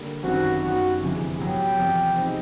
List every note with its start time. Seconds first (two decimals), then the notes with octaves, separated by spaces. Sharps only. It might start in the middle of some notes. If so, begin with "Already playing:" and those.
Already playing: D3 G3 A#3
0.23 G#1 F#2 D#3 G3 C4 F#4
0.62 F#2 D#3 G3 B3 F#4
1.01 G1 F2 C3 E3 G#3
1.39 A2 F#3 B3 G4
1.78 E2 C3 F3
2.17 B2 G#3 C4 D#4